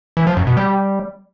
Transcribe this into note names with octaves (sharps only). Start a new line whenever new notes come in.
E3
F3
F#2
B2
G3